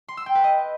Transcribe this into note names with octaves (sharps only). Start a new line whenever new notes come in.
C6
E6
G5
B4
D#5